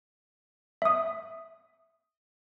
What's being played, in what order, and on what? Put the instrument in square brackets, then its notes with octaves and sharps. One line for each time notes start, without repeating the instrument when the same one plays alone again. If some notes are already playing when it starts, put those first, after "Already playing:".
[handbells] E5 D#6